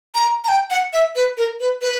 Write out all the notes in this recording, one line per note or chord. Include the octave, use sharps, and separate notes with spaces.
A#5
A#5
G5
F#5
E5
B4
A#4
B4
B4